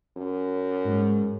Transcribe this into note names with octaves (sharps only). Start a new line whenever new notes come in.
F#2
G#2